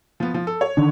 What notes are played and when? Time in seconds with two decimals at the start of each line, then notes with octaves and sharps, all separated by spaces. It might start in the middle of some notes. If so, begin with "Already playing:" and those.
0.20 F3 B3
0.34 F3
0.47 A4
0.61 C#5
0.77 D3 D#3 D4